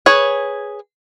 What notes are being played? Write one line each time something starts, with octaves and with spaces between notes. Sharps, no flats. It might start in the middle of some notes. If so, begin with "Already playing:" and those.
G#4 B4 C#5